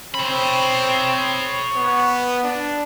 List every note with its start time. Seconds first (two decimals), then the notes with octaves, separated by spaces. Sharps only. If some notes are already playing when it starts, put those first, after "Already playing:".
0.15 C4 C#5 B5
1.75 B3
2.43 D4